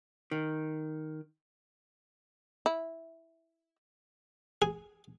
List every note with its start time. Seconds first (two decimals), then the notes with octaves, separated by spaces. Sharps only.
0.31 D#3
2.66 E4
4.62 G#4